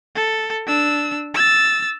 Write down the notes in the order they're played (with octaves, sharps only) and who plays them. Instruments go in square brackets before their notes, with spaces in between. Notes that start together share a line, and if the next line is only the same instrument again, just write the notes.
[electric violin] A4
D4 E6
E6 A6